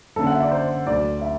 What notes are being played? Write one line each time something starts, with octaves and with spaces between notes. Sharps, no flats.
F#1 F#2 D3 A4
F#5
E5
D5
C5
D2 D3 F#3 D5
E5